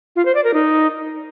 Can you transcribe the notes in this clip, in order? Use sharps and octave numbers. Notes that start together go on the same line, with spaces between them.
F4
C5
D5
A#4
D#4